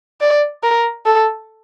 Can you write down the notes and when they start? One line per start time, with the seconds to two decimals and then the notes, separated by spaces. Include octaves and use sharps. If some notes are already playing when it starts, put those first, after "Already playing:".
0.21 D5
0.63 A#4
1.06 A4